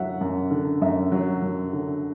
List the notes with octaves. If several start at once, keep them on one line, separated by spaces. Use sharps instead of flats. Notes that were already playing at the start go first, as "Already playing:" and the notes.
Already playing: F#2 D3 F#3 E5 F#5
F#2
D3
F#2 E5
F#3
F#2
D3